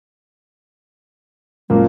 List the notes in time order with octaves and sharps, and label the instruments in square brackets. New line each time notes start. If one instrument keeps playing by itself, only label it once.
[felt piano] F#1 [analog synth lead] A#2 [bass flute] G#3 [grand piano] A#3